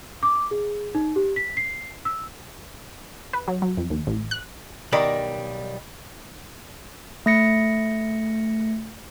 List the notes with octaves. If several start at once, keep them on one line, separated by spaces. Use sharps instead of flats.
D6
G#4
D#4
G4
B6
C7
E6
B4
F#3
F#3
F2
D#2
A1
F#6
B1 D#3 G3 A#4 D5 B5
A3 A#6 C#7